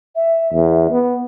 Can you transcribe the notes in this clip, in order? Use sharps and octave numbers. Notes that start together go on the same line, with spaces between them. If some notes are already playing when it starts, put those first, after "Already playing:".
E5
E2
B3